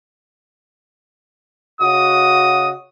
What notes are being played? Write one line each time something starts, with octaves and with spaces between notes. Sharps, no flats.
C#3 F#4 D#5 D#6